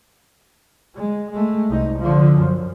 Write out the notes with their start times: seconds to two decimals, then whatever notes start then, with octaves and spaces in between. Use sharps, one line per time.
0.96 G#3
1.31 G#3 A3
1.69 C2 D#4
1.99 D3 F3
2.38 F#2